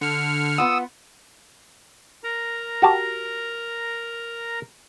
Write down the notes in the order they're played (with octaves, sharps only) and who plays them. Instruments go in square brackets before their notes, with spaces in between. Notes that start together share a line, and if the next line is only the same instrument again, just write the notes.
[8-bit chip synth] D3 F6 [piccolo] C#7
[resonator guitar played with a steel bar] B3 F4 F#5 [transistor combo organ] D#6 E6
[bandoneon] A#4 A#5
[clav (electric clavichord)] F#4 G4 A5